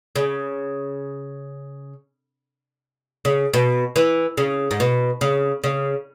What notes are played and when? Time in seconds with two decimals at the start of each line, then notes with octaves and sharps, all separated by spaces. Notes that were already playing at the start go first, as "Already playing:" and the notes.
0.16 C#3
3.25 C#3
3.53 B2
3.96 E3
4.37 C#3
4.71 G#2
4.80 B2
5.21 C#3
5.64 C#3